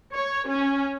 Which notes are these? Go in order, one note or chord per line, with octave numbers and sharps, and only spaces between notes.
C#5
C#4